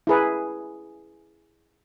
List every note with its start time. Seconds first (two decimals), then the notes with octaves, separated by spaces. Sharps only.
0.07 E4 G#4 B4